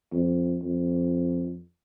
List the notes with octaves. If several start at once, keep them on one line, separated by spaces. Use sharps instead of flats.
F2
F2